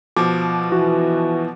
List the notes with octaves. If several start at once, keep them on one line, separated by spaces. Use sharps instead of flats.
B2 F3 D6
E3 F#4